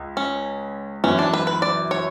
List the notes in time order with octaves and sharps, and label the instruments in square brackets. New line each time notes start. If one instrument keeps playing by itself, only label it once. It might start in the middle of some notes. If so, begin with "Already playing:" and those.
Already playing: [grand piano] C#2
[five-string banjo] C#4
[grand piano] F#2 E3 B3 [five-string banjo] C#4
[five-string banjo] D4
B4
B4
D5
C#5